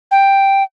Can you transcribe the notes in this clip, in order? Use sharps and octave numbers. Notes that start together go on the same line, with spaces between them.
G5